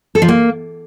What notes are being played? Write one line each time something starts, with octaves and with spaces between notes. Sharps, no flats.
A4
F3
A#3